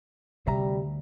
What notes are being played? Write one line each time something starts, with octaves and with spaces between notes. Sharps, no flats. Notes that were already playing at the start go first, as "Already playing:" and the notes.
D2 C3 G3 E5 A#5